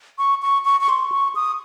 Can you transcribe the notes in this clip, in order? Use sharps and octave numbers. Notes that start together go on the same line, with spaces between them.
C#6
C#6
C#6
C#6
C6
C#6
D#6